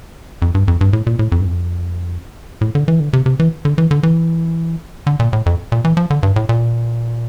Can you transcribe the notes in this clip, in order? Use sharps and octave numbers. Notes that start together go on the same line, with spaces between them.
F2
G2
F2
G2
A2
A#2
A2
F2
G2
F2
A2
D3
E3
D3
C3
C3
E3
D3
E3
D3
E3
D3
A#2
A2
F2
A#2
E3
F3
D3
G2
A2
A#2